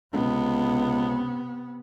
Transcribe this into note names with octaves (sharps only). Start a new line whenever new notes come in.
C#2 C3 B3